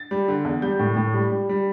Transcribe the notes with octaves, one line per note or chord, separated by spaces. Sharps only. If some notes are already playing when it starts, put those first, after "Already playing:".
Already playing: A6
G3
D3
E2
G3 G6
A2
A2
G3
G3
G3